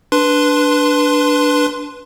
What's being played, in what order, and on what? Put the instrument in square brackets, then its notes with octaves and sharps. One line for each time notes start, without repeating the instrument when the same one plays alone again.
[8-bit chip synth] D4 B4 C6